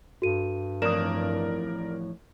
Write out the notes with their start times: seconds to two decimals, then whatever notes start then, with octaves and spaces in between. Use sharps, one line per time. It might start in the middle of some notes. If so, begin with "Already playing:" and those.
0.22 G2 F#4 A4 D#7
0.82 F2 A2 E3 A#4 D5 D#6 E7